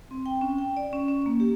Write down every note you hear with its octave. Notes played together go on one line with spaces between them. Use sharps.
C4
G5
C#4
G5
D5
C#4
C#4
A#3
G4